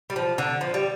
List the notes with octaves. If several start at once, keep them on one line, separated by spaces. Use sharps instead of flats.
G3
F3
D3
F3
G3